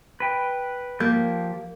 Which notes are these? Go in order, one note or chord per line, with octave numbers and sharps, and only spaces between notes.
B4 G5
F3 A#3 G4 G6